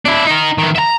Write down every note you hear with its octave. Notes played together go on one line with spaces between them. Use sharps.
D4 E4
D#4 A#4
D#3 E3
E5 A#5